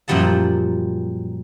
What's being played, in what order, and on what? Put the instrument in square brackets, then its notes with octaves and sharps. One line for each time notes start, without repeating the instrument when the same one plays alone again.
[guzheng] F#2 A#2 F3 G3 F#5 A5